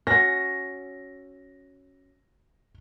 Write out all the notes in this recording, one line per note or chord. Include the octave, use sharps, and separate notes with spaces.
C#4 F#4 A#6